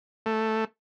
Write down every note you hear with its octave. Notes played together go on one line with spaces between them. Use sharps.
A3